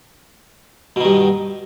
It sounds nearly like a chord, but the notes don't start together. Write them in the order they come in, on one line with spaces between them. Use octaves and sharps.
B2 D#3 G2